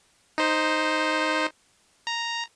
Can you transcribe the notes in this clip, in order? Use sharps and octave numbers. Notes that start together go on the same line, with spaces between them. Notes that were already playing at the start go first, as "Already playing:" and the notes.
D#4 C5
A#5